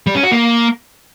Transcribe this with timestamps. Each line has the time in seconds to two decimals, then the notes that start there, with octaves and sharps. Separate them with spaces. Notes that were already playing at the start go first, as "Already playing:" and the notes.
0.07 G3
0.15 C#4
0.23 F#4
0.32 A#3